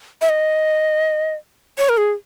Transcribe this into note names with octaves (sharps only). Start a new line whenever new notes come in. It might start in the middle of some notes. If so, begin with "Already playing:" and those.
E5
D#5
C#5
A#4
G#4